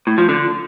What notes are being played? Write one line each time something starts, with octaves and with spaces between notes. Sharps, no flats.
A2
F3
D3